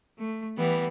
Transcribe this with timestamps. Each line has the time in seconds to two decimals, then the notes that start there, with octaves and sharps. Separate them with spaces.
0.18 A3
0.56 E3 G3 B3